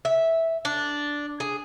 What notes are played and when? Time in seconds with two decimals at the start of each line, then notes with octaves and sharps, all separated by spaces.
0.05 E5
0.65 D4
1.40 G#4